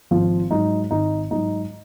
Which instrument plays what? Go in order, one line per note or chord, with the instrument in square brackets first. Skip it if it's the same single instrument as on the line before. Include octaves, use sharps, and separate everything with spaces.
[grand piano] G#1 F3 F4
G#2 F#3 D#4
G#1 D#4
G#2 F#3 D#4